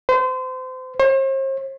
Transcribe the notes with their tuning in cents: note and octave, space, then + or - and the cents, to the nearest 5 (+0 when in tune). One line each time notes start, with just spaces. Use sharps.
C5 -30
C5 +45